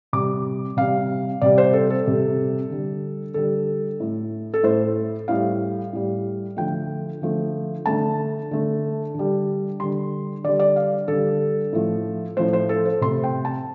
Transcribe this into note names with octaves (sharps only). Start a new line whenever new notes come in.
C3 G3 D6
C3 G3 F5
C3 G3 D5
C5
A4
A4
C3 G3
D3 G3
D3 G3 A4
A2 A3
A4
A2 A3 C5
A2 G3 F5
A2 G3
D3 F3 A3 G5
D3 F3 A3
D3 A3 A5
D3 A3
D3 G3
D3 G3 C6
D3 G3 D5
D5
F5
D3 G3 A4
A2 F3 A3
A2 F3 A3 C5
C5
A4
C5
C3 A3 C6
G5
A5